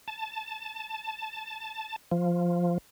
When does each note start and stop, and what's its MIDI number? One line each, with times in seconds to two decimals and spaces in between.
0.08 1.96 81
2.11 2.78 53